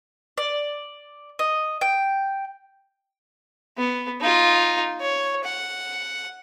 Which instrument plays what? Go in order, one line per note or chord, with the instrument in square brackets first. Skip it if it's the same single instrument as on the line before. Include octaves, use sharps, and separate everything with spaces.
[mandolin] D5
D#5
G5
[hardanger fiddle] B3
D#4 F4
C#5
F#5